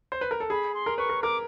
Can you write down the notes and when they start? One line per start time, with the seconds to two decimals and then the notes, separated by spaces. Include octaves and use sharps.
0.12 C5
0.21 B4
0.31 A#4
0.40 A4
0.50 G#4 B5
0.75 C6
0.86 A#4
0.98 B4 C#6
1.09 A#4
1.23 A#4 D6